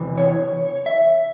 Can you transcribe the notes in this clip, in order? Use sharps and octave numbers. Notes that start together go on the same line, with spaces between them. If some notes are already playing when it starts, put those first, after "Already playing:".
Already playing: E2 C3 E3
C#5
E5